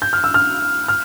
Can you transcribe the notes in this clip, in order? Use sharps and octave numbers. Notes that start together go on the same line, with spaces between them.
G6
F6
E6
F6
F6